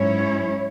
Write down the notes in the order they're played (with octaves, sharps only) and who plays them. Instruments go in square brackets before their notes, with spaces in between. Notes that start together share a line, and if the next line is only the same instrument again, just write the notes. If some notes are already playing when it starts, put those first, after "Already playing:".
Already playing: [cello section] G#2 F#3 C#4 E4 C#5